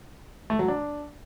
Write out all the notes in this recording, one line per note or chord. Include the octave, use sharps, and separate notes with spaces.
A3
F#3
D4